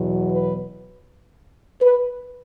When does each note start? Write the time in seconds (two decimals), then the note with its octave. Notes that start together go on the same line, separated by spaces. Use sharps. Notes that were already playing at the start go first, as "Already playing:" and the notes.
Already playing: E2 B2 F#3
0.31 B4
1.82 B4